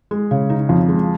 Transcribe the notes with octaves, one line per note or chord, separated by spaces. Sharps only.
G#3
C#3
D#4
F2
G#3